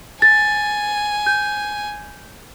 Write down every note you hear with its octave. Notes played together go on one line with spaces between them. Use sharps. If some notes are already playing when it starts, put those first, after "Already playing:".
G#5 A6
G6